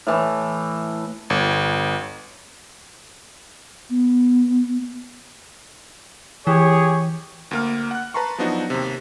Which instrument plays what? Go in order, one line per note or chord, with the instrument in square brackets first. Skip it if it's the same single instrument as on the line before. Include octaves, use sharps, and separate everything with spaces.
[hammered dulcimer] A2 E3
[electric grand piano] G1
[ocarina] B3
[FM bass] E3 [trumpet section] G4 G#4 C#5
[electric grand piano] D2 A#3 F6
F#5 F#6
B4 A5 A#5 C6 C#6
F3 F#3 B3 D4 D#4 F#4
D#2 C3